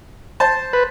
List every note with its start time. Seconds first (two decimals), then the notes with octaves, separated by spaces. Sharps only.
0.40 C5 A5
0.73 B4